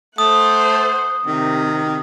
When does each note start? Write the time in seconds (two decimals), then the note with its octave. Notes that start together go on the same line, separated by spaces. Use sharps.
0.18 A3 C5 F#5 D#6
1.27 C3 D#3